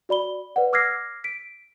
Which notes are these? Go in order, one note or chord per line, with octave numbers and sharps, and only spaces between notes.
F#4 D5 B5 G7
B4 D5 F#5
D6 E6 F6 G#6 A#6 C7
B6 D7